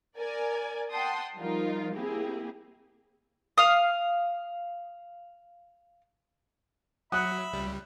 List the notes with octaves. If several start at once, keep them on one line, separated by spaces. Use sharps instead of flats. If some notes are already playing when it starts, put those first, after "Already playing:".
A#4 D5 G#5
F#5 G5 A5 C6 D#6
F3 G3 D#4 F4 A#4
A#3 C4 E4 G4 G#4
F5 D#6
F#3 E5 F#5 B5 D#6 F#6
C#2 G3